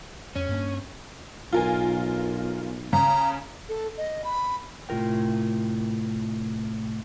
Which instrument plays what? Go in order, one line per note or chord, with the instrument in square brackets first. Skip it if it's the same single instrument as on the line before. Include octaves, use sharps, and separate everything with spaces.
[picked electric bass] F2 [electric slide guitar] C#4
[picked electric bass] G2 A#3 D4
[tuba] B1 [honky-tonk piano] F4 A#4 G#5
[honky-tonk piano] C#3 [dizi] A#5
[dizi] A4
D#5
B5
[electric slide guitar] A2 C3 F4 A#4 G5